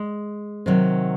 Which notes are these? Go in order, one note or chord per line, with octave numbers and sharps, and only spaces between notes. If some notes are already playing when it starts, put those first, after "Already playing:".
Already playing: G#3
C3 D#3 F#3